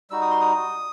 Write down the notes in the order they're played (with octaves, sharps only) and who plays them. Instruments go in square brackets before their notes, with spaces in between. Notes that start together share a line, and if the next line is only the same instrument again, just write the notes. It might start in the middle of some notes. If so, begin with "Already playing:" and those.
[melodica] G3 D#4 F#4 E6
D#6
C6
D#6